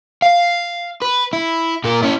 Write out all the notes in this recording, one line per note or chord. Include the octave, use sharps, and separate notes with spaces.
F5
B4
E4
A#2 A#4
C#4 E4